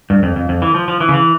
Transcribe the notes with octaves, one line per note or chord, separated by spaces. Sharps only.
G2
F2
F2
F2
E3
F3
F3
E3
C#3
E3